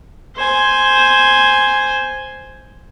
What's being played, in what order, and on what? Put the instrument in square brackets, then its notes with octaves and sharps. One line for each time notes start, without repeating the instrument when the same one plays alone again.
[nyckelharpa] C5 G#5